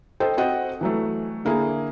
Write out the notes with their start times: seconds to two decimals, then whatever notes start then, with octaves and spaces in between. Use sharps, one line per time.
0.20 A4 C5 D#5 G5
0.37 C4 F#4 D#5 F#5 G5
0.81 E3 F#3 A3
1.45 D3 A#3 E4 G#4